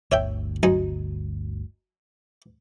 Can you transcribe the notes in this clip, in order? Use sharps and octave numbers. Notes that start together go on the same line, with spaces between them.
G1 D2 C#5 E5 G5
F#2 D#4 G#5